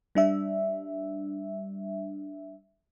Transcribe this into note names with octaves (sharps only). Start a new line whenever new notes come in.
G3 D4 E5